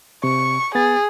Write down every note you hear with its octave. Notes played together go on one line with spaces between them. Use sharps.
C3 C#6
B3 G#4 A6